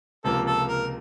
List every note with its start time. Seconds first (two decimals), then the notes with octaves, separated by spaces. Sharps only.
0.24 C#2 C3 F3 A#3 A4
0.47 A4
0.69 A#4